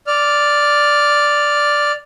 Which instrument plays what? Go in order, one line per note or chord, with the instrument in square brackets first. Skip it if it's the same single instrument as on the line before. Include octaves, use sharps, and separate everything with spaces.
[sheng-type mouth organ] D5 F6